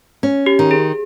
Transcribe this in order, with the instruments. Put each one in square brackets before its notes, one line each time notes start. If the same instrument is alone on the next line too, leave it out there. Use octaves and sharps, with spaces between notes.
[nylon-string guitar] C#4
[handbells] G4
[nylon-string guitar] D#3
[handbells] G#4